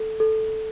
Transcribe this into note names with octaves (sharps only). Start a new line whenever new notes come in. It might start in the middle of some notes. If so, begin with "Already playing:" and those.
Already playing: A4
A4